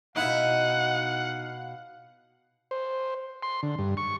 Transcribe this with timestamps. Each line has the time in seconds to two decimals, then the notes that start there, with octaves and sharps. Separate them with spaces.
0.16 B2 D#4 E4 F5 F#5
2.71 C5
3.43 C6
3.63 D3
3.79 G2
3.97 C#6